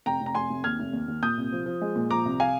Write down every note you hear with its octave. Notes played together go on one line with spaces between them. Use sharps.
F1 G5 A#5
F1
A#5
F1 G#5 C6
F1
D#2 F6 G#6
F1
D#2
D#2
A#2 D#6 G6
C2
F3
F3
G#3
A#2
F3 A#5 D6
C2
F5 G#5